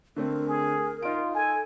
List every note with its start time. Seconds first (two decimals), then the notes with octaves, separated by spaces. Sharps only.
0.16 D3 A3 C4 A#4
0.48 G#4
1.02 D#4 F4 D7
1.35 A4 G#5